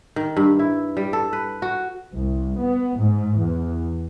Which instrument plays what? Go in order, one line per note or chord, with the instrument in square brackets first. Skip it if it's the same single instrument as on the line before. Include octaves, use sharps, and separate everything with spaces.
[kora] D#3
G2
E4
G3
A4
B4
F#4
[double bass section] C2
B3
G#2
E2